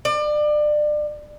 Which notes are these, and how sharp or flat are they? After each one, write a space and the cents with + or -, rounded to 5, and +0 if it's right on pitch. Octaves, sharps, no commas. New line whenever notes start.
D5 +30